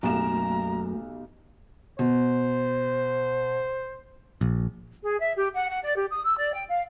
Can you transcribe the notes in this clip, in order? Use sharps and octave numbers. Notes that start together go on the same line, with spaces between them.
B1 F#2 A3 A#3 F#4 G4 A#5 E7
B2 C5
A#1
G#4
E5
G4
F#5
F#5
D5
G4
D#6
E6
D5
G5
F5